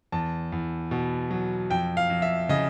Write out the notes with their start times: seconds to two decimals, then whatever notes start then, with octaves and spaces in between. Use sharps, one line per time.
0.12 E2 A5
0.52 E2
0.91 B2
1.31 F#3
1.70 F2 G5
1.97 F5
2.10 F2
2.22 E5
2.49 C#3 D#5